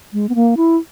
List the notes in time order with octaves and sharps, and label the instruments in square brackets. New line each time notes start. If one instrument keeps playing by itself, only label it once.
[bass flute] G#3
B3
A#3
E4